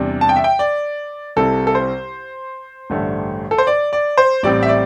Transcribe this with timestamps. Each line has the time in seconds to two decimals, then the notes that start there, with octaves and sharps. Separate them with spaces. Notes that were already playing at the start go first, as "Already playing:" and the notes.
Already playing: E2 C3 G3 D4
0.21 A5
0.29 G5
0.36 E5
0.44 G5
0.59 D5
1.36 C2 C3 G3 C4 E4 A4
1.67 A4
1.75 C5
2.90 A1 G2 D3 A3
3.51 A4
3.58 C5
3.67 D5
3.93 D5
4.17 C5
4.43 A1 A2 G3 C4 D5
4.63 E5
4.69 D5